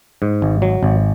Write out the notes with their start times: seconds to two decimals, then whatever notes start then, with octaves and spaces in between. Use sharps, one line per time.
0.22 G#2
0.42 G#1
0.62 F#3
0.83 G#1